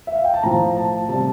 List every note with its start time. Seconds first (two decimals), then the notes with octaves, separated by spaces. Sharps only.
0.07 E5
0.16 F5
0.25 G5
0.34 A5
0.43 A2 F3 A#5
0.77 A5
1.09 C3 G3 A5